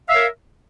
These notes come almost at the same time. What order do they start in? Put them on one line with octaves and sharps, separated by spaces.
F5 E5 C#5 A#4